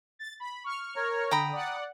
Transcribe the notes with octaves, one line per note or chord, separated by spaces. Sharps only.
A6
B5
C#6 F6
A#4 C#5
D3 G5 A#5 B5 D#6
D5 F#5